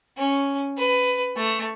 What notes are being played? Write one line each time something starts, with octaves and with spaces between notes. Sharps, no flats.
C#4
B4
A3